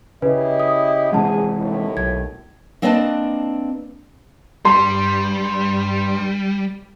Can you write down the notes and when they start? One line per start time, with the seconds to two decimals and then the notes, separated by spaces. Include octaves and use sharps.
0.22 C#3 E4 G4 B4 D#5
0.60 D#6
1.12 C3 E3 G#3 G#4 F#5 A5
1.60 D#2 A2
1.97 B1 G#6
2.82 A#3 C4 D4 B4 D#5 A5
4.65 G2 G3 C6